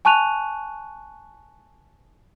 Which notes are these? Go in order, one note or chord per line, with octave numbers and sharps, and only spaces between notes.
G#5 A5 C#6 F#6 D#7 F7